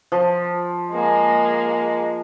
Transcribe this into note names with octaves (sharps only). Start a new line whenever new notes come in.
F3
G#3 A#3